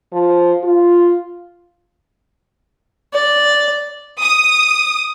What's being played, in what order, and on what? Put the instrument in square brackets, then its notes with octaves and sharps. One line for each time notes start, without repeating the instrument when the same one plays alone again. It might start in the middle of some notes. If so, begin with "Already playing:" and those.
[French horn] F3
F4
[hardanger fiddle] D5
[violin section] D#6